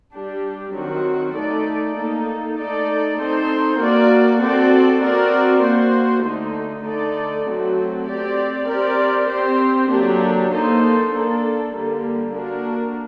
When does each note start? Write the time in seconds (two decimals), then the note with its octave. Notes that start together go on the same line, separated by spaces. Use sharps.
0.12 G3 D4 G4
0.73 D#3 F#3 C4 F#4
1.34 A3 D#4 A4 D5
1.96 A#3 D#4 A4
2.57 A3 D#4 A4 D5
3.18 C4 D#4 A4 C5
3.79 A#3 F#4 A#4 D5
4.40 C4 F#4 A4 D5
5.01 C4 F#4 A#4 D5
5.62 A#3 F#4 C5
6.24 D3 A3 D#4
6.85 D3 A3 D#4 A4 D5
7.46 F#3 A3 C4 F#4 A4
8.07 C4 G4 D5
8.68 C4 G4 A#4 D5
9.29 C4 G4 C5
9.90 D3 F#3 A#3 D4 G4
10.51 A#3 D#4 A4 C5
11.13 A#3 D4 A4
11.74 D3 G3 A#3
12.35 A#3 D4 F#4 A#4